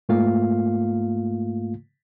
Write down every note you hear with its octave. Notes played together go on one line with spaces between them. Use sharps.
G#2 A3 A#3 F4 F5